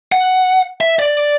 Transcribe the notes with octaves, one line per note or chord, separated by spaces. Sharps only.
F#5
E5
D5